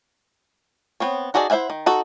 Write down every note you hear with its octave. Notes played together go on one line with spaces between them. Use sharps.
B3 C4 C#5
D#4 F#4 G#4 A4 D5
E4 C5 E5 F#5 G#5
D#3
D#4 F#4 A4